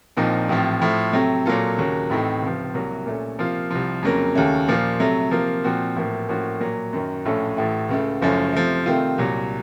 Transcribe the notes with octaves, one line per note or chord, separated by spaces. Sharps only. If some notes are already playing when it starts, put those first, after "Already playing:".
A#1 A#2 F3 C4 D#4
A1 A2 F3 C4
A2 F3 A3
C3 F#3 A3 C4
A#2 F#3 A#3 F4 A4
D#2 C#3 F#3 A#3
A1 A2 A3 C4 D#4
C#2 C3 F3
C2 C3 F#3 A#3
A#2 A3 C#4
C3 F3 A#3 F4
C2 C3 F3
F2 C#3 F#3 A#3
D#2 C#3 A3 C#4
A#2 F3 A#3 F4
C3 F#3 A3
C3 F3 A#3 F4
A#2 F3 C4 F#4
A1 A2 F3 A#3
A2 F3 A#3 C#4 F#4
A#2 F#3 A#3
F#2 D#3 F#3
A#1 A2 A3 C#4 A4
A1 A2 A3
C#2 C#3 A3
F#1 F#2 F3 A3 C#4
C3 F3 A3
C3 D#3 A3 C4 F4
C2 A#2 F#3